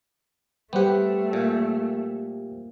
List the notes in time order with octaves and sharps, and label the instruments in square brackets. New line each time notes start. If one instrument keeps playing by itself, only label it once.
[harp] G3 [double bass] A3 [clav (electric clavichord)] B3 F#5 [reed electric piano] G4 C5 G5
[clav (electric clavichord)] A#2 [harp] G6 C#7